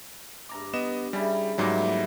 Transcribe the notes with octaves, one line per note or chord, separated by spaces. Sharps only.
G2 A#5 D6
B3 D#5 E7
C#3 G3 E4
G#2 E3 F#3 G3 A#3 A#4